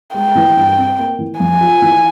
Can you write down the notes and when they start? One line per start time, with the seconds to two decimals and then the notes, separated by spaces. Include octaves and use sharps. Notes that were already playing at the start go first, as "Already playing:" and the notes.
0.14 G#3 G5
0.35 E3
0.56 G2
0.77 C4
0.99 A#3
1.19 E3
1.40 F2 G#5
1.61 F4
1.82 E3